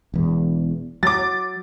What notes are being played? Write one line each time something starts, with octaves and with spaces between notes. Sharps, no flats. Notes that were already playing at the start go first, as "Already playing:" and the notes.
E1 E2
F#3 D6 A6